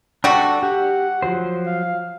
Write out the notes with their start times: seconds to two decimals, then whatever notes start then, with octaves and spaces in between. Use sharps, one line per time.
0.24 G3 D4 F#4 A4 C#6
0.63 G4 F#5
1.22 F3 F#3 C5
1.66 F5